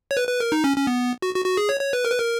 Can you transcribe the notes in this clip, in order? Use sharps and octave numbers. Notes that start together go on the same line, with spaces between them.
C#5
B4
B4
A#4
D#4
C#4
C#4
B3
F#4
F#4
F#4
G#4
C#5
C#5
B4
A#4
B4
A#4